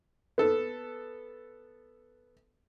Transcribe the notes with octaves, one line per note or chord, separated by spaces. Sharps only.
B3 A4